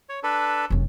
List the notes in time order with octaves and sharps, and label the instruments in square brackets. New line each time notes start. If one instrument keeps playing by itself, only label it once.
[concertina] C#5
D4 A4 B4
[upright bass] F1 F#2